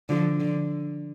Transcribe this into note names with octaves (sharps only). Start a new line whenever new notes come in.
D3 F3
D3